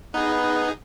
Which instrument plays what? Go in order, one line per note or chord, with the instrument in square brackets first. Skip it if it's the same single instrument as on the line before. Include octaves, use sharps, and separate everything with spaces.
[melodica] B3 B4 [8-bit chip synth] D#4 G#4